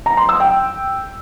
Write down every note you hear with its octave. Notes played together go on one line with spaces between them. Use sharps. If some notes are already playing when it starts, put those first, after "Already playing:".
A#5
C6
E6
G5